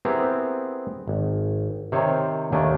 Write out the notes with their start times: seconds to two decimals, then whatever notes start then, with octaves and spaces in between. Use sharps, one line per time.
0.05 B3 C4 E4 G4 G#4 A#4
1.08 G#1
1.92 C3 D#3 C5 C#5
2.52 D#2 D#3 A3 D4 G5 G#5